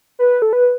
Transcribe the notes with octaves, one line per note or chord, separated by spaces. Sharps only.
B4
A4
B4